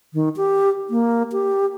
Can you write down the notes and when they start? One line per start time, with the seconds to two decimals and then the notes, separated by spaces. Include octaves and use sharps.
0.14 D#3
0.36 G4
0.90 A#3
1.32 G4